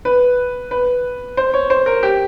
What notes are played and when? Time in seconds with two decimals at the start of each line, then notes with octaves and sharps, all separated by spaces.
0.05 B4
0.71 B4
1.37 C5
1.54 C#5
1.70 C5
1.86 A#4
2.03 G4